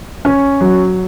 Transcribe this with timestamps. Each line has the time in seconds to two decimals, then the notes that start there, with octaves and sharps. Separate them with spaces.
0.25 C#4
0.61 F#3